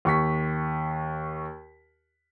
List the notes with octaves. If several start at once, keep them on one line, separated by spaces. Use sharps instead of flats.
D#2 C#6 B6